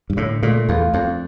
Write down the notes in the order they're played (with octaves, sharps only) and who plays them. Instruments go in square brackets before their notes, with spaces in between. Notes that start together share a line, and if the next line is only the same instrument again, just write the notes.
[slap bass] G2
[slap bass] A2 [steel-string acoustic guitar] D3
[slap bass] A#2 [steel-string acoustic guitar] A3
[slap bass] E2 [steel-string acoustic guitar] F4
[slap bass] F2 [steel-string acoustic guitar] D4